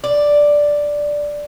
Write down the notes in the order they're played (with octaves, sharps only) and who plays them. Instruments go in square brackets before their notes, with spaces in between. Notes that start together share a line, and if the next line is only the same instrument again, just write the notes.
[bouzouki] D5